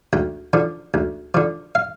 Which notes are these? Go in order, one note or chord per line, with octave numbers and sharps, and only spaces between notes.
D2 G5
D3 F3
D2
D3 F3
F5